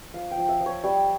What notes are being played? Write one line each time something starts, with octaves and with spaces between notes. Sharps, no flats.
F3 F5
G5
F3
E5
F3
C#5
G3 C#5